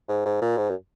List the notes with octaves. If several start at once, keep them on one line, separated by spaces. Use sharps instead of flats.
G#2
G#2
A#2
G#2
F#2